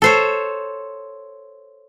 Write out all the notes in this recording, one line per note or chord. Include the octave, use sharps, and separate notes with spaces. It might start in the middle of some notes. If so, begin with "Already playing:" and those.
A4 C5 C#5